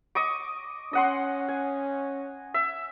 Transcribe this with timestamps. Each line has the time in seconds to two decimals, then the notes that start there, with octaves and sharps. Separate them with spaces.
0.15 D#5 C#6 D6
0.93 C#4 D#5 F#5 C6
1.49 G#5
2.54 E5